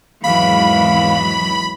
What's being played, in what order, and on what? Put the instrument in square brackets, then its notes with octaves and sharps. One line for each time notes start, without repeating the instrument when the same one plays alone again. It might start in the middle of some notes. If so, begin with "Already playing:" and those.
[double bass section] G#1 E2 [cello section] E3 F#3 G#3 [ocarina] F5 [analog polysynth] B5